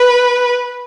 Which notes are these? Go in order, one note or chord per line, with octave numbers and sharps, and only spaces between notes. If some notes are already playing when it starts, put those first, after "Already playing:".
Already playing: B4